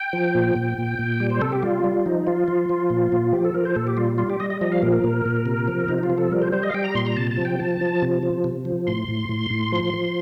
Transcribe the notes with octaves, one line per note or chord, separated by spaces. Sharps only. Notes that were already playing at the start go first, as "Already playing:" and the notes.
Already playing: G5
F3
A#2
A#2
A#2
A#2
G3
C5
C3 A4
G4
G3 F4
G3
F3 D#4
F3 F4
F3
F3
A#2
A#2
F3 G4
A4
F3 A#4
C5
A#2 A4
G4
G3 F4
G3 F4
G4
G3 D#5
D#5
F3 D#5
F5
A#2 A#4
A#4
A#2
A#2
C3
F3
C3 D#4
D#4
F4
F3
A4
G3 A#4
C5
G3 C5
D#5
F5
G3 G5
A#5
A#2 C6
A#5
C3 A5
A5
F3
G5
F3 A5
F3
C3
F3
C3
F3
A2 C6
A2
A2
A2
F3
F3